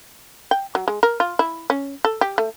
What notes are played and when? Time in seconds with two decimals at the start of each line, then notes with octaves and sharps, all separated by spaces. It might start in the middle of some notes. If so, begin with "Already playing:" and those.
0.51 G5
0.75 F#3
0.88 G#3
1.03 A#4
1.20 F4
1.39 E4
1.70 C#4
2.05 A4
2.21 G4
2.38 A3